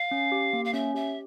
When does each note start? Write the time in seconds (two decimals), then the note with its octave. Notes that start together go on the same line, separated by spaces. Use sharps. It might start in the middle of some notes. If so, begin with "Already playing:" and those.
Already playing: F5
0.11 C#4
0.32 G4
0.53 A#3
0.65 F5
0.73 C#4 E5
0.94 G4 E5